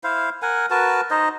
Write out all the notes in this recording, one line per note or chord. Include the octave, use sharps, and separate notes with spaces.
E4 C5 F5
A#4 F#5 G#5
F#4 A#4 B4 A5
D#4 C5 D#5